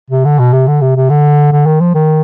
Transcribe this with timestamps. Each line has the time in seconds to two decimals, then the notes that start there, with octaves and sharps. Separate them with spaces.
0.10 C3
0.25 D3
0.39 B2
0.53 C3
0.67 D3
0.81 C3
0.96 C3
1.10 D3
1.52 D3
1.66 D#3
1.80 F3
1.95 D#3